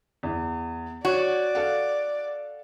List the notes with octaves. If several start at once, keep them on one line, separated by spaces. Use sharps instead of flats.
E2
F#4 C#5 D5
A4 F5 F#5